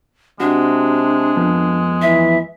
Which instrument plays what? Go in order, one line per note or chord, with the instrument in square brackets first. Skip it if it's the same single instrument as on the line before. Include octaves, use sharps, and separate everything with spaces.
[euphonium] C3 [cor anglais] G#3 [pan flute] D4 [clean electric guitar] F#4
[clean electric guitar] F2 F3 B3
[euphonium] E3 [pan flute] E5